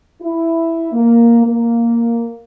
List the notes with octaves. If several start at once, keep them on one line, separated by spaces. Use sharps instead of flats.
E4
A#3
A#3